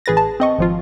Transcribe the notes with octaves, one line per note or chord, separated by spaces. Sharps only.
A1 G#4 B4 A6 A#6
A5
C4 D#5 C#6
G#1 F3 F4